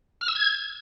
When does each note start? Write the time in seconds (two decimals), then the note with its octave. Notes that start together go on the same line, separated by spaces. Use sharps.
0.21 F6
0.28 E6
0.35 G#6